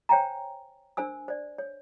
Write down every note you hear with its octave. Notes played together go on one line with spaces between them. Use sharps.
C5 C#5 G5 G#5 A#5
D4 A#4 C5 G#5 E6
C5 D5
C#5